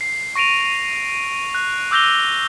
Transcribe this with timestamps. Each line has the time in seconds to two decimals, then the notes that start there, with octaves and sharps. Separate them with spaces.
0.01 C7
0.35 C#6 A#6 D7 D#7 F7
1.55 F#6
1.91 D6 E6 G6 A#6 F7 G7